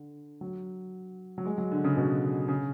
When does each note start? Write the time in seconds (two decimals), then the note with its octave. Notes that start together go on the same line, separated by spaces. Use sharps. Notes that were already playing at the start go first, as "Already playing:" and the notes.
Already playing: D3
0.41 F#3
1.38 F#3
1.45 G#3
1.58 F#3
1.72 D3
1.84 C#3
1.97 B2
2.48 C#3